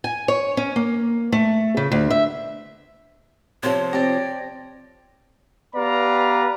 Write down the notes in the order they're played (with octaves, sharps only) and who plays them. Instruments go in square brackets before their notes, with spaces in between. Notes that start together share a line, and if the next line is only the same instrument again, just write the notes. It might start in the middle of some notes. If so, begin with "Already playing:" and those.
[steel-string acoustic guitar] G#5
C#5
C#4
A#3
A3
C#3
D2
E5
[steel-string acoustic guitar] C3 F3 [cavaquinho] C5 [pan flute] C#5
[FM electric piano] C4 A#6 [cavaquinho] G4 D5
[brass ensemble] B3 G4 B4 D5 F5 A#5